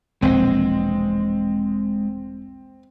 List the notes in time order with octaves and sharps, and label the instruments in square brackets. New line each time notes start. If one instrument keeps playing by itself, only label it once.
[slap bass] E1 A#1 E3 [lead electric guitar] G#3 D#5 [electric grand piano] C4